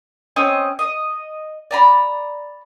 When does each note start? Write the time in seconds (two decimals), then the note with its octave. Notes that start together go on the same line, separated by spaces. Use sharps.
0.36 C4 C#4 D#5
0.79 D#5
1.71 D5 A#5 B5